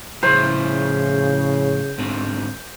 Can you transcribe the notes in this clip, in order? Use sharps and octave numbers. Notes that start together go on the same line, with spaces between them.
A2 C#3 F3 E4 C5
G#2 D3 C4